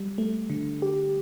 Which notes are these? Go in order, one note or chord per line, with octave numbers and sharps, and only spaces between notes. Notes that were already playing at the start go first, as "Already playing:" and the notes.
Already playing: G3
A3
D3
G4